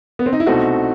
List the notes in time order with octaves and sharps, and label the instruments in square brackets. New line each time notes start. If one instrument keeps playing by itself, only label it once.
[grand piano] B3
C4
D#4
E4
[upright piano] C2 B2 A3 C4 [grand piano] D#4 F#4